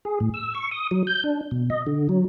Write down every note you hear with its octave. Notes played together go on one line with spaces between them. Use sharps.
G#4
A2
E6
C#6
D#6
F#3
G6
D4
B2
D#5
D3
F#3